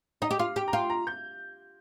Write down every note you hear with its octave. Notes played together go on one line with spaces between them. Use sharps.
D#4 D#5
G4
F4 F5
G4 G5
A#5
F4 G5
A#5
G6